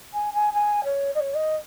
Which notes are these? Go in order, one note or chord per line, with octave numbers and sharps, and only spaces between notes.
G#5
G#5
G#5
C#5
D#5
C#5
D#5